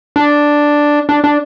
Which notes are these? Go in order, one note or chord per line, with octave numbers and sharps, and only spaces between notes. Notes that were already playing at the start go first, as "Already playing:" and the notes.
D4
D4
D4